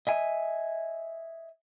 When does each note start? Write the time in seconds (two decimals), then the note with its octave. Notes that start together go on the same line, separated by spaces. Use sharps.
0.07 D#5 E5 G#5